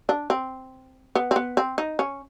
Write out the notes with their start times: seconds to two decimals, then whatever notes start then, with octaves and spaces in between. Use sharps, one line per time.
0.09 D4
0.30 C4
1.15 B3
1.31 C4
1.36 B3
1.57 C4
1.78 D#4
1.99 C#4